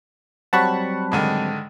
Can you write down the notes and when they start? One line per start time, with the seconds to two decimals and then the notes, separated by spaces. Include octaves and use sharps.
0.53 F#3 G3 C4 F#5 A5 B5 C#6
1.12 G#2 D3 D#3